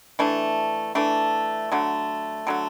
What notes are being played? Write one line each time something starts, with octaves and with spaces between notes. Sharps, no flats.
E3 A3 D4
E3 A3 D4
D3 F#3 A3
D3 F#3 A3